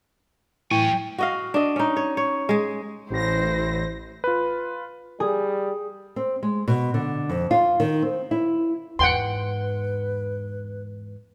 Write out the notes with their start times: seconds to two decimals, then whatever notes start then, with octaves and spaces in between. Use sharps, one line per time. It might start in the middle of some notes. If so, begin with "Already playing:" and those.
0.71 A2 E3 F#3 G5 G#5 C#6
1.18 F#4 D#5 F5
1.54 D4 D#5
1.76 C#4 D#4
1.97 C#5
2.17 C#5
2.49 G#3 G#4
3.10 A1 E4 C5 A#6
4.24 F4 B4
5.20 G3 G#4
6.16 C4
6.43 G#3
6.68 B2
6.94 D3
7.29 F2
7.51 F4
7.80 D#3
8.02 C4
8.31 E4
8.99 E2 G#2 B4 F#5 G5 C6